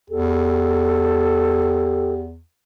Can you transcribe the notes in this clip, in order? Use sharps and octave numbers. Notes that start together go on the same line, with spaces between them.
E2 G4 A4